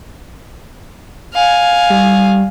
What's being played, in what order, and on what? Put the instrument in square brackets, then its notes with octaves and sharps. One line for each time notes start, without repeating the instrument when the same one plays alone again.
[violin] F5 G#5
[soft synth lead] G3